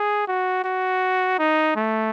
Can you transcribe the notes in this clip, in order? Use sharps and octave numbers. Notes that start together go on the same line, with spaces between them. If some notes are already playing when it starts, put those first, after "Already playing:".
Already playing: G#4
F#4
F#4
D#4
A3